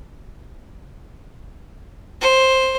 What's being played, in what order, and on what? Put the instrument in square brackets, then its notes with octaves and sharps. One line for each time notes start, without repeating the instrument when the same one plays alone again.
[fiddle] C5